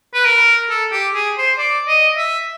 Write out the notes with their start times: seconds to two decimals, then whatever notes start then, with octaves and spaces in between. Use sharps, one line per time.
0.14 B4
0.26 A#4
0.70 A4
0.92 G4
1.14 G#4
1.37 C5
1.59 D5
1.88 D#5
2.17 E5